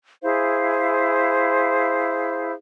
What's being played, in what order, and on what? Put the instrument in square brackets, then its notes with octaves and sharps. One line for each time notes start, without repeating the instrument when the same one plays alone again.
[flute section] E4 G#4 C5 F5